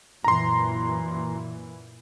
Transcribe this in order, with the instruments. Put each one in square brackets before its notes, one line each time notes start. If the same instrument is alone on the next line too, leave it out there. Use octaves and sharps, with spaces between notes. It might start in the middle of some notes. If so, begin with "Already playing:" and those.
[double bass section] F#2 A#2 E3 [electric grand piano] A#5 C6